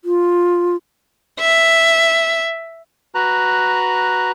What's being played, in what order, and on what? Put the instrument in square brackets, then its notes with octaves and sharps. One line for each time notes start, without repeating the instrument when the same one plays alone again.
[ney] F4
[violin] E5
[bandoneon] F#4 B4 A#5 F#6